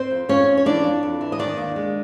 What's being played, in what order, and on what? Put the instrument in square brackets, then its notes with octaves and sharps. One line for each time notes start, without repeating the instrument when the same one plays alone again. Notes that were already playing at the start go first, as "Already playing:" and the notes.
Already playing: [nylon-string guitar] C4 C5
F2
F2 C#4 C#5
F2
C#5
E3 D4 D5
F2
F2
E3
D#5
D#3 D4 D5
D#2
G#3